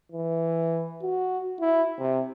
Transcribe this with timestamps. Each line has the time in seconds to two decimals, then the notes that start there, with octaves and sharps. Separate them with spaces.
0.12 E3
1.02 F#4
1.60 E4
1.99 C3